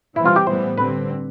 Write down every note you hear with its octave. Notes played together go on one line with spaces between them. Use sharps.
E3 G3 C4 E4
F4
G4
A2 E3 G3 B3 C5
D3 G3 C4 B4